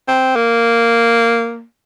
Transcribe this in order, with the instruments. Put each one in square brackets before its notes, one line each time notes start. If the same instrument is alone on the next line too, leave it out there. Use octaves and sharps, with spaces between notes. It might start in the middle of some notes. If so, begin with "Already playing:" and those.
[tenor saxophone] C4
A#3